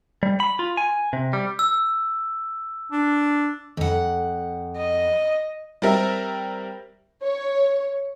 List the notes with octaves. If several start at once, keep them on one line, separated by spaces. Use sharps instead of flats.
G3
B5
F4
G#5
C3
G3
E6
D4
F2 F#5
D#5
G3 C4 A#4 E5
C#5